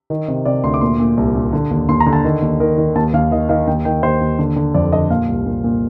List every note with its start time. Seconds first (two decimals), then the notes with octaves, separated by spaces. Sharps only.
0.10 D#3
0.28 C3
0.45 C3 D5
0.64 D2 C6
0.74 D6
0.81 A#2 C6
1.00 A#2
1.17 C2
1.35 A#2
1.53 D3
1.71 D#2
1.89 D#2 C6
2.00 A#5
2.06 D3
2.13 A5
2.24 D#3
2.42 D#2
2.60 D#3 A#4
2.78 D#3
2.95 D#2 A5
3.13 D#2 F5
3.31 D#3 D#5
3.49 D#3 F5
3.67 D#2 G5
3.85 D#3 G5
4.03 D#2 C5
4.21 D#2
4.39 D3
4.56 D3
4.74 F2 D5
4.92 D3 D#5
5.10 A#2 F5
5.28 C2
5.46 A#2
5.64 A#2